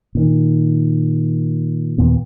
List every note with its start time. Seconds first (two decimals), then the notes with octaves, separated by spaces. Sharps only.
0.15 A#2 D#3
1.98 D#2 A#2 B3